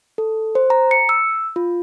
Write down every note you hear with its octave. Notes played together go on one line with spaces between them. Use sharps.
A4
C5
A#5
C#7
E6
F4